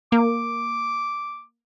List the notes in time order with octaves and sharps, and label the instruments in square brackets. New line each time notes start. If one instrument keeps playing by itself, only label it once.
[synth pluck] A#3 [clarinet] D6